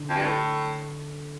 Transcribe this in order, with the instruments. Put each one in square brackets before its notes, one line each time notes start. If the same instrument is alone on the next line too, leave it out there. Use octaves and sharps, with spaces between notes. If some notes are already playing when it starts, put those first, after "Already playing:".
Already playing: [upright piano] D3
[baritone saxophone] F2
G2
A2